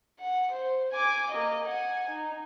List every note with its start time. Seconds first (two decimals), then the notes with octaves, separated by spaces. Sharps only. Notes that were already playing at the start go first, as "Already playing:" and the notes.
0.20 F#5
0.51 C5
0.92 G#5 D6
1.30 A#3 D#5
1.64 F#5 G#5
2.09 D#4